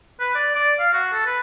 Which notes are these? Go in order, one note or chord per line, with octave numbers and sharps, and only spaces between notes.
B4
D5
D5
F5
F#4
A4
B4